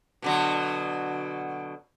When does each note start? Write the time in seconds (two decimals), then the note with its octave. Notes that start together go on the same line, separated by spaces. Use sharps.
0.22 B2 D3 F#3